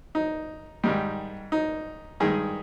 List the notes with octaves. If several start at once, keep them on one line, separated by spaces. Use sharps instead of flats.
D#4
G#2 D#3 G3 D#4
D#4
G2 D#3 G#3 G#4